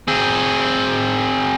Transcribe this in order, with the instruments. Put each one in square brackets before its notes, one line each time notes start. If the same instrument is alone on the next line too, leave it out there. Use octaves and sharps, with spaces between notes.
[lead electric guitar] C4 G#4